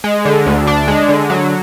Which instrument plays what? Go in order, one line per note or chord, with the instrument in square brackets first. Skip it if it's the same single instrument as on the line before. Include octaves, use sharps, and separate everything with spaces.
[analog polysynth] G#3
D3
D2
D4
G#3
D3
F#3